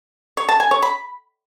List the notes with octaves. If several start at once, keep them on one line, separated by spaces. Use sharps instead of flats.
C#5
A5
G#5
C#5
B5